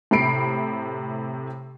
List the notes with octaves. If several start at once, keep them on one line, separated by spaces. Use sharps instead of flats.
A2 C3 B5 C7 D7